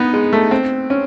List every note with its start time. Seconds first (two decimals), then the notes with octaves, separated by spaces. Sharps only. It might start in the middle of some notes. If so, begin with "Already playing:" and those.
Already playing: B3 D#4
0.14 G#3
0.33 A3
0.51 C4
0.90 C#4